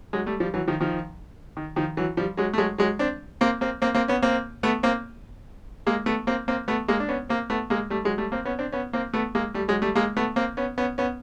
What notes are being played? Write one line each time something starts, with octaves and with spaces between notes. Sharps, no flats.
F#3 G#3
G3 A3
F3 G3
E3 F#3
D#3 F3
D#3 F3
D#3
D#3 F3
E3 F#3
F3 G3
F#3 G#3
A3
F#3 G#3
F#3 G#3
C4 D4
A#3 C4
A#3 C4
A#3 C4
A#3 C4
B3 C#4
A#3 C4
A3 B3
A#3 C4
G#3 A#3
A3 B3
A#3 C4
A#3 C4
A3 B3
G#3 A#3
D4
B3 C#4
A#3 C4
A3 B3
G#3 A#3
G3 A3
F#3 G#3
G3 A3
A#3 C4
B3 C#4
C4 D4
B3 C#4
A#3 C4
A3 B3
G#3 A#3
G3 A3
F#3 G#3
G3 A3
G#3 A#3
A3 B3
A#3 C4
B3 C#4
B3 C#4
B3 C#4